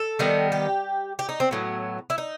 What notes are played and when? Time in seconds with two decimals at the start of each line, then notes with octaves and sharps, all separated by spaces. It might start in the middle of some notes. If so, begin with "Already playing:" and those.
Already playing: A4
0.19 D#3 G3 B3
0.52 G4
1.19 G4
1.29 D#4
1.40 C4
1.51 A2 F#3 B3
2.10 E4
2.18 D#4